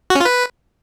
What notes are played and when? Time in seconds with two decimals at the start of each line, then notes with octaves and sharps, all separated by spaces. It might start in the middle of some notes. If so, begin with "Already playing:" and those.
0.10 F#4
0.15 C#4
0.20 F4
0.25 B4